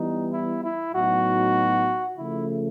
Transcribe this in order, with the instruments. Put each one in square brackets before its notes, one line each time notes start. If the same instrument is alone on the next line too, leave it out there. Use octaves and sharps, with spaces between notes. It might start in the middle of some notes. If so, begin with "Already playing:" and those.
Already playing: [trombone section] E3 G3 B3 [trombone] D#4
[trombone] E4
E4
[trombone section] A2 F#3 B3 D#4 [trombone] F#4
[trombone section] C#3 F3 A3 [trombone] E4